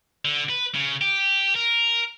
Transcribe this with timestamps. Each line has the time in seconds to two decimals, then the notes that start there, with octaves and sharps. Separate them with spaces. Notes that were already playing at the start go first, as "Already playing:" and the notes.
0.25 D3
0.50 B4
0.74 C#3
1.01 G4
1.56 A#4